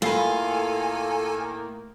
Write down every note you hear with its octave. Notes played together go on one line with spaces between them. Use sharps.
A2 D#3 A#3 F4 A4 F5 G#5 B5